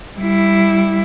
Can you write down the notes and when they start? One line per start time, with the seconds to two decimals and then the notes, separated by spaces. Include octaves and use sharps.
0.18 G3 E4